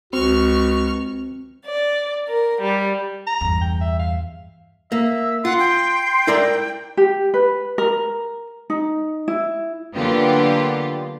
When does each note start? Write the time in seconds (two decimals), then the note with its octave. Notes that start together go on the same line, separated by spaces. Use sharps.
0.13 C#2 C4 F#4 C#6 F6
1.66 D5
2.27 A#4
2.61 G3
3.27 A#5
3.41 E2 G2
3.61 G5
3.81 E5
3.99 F5
4.92 A#3 E5
5.45 F4 F#5 C6
5.59 G5
6.27 E4 A#4 D5
6.97 G4
7.34 B4
7.78 A#4
8.70 D#4
9.28 E4
9.95 D3 F#3 A#3 B3 F4 G4